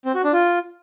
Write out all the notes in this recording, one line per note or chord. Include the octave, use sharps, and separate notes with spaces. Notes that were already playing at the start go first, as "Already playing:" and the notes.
C4
F#4
D4
F4